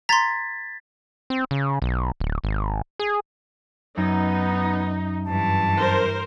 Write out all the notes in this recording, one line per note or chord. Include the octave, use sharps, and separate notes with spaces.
A#5 C6 G#6 A6 B6
C4
C#3
B1
D1
G#1
G#4
F#2 B3 D#4
G2 E3 A5
A#4 C5